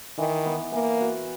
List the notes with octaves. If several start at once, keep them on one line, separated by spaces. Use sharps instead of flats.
D#3 E3
B3
E3 A#3
F#4